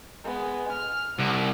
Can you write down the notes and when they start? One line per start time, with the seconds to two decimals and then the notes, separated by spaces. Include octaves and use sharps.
0.24 G#3 B3
0.72 F6
1.19 C2 F#5